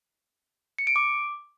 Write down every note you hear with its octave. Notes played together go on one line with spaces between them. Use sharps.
C#7
D7
D6